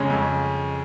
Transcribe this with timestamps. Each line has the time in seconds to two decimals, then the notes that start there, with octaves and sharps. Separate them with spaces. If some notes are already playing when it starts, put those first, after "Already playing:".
Already playing: F2 C#3 G#3 C#4
0.10 F2